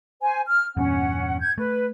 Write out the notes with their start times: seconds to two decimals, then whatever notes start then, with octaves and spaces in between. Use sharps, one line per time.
0.23 C5 G#5
0.47 F6
0.77 E2 G2 A#2 C#4 F#5
1.39 G6 G#6
1.58 A3 B4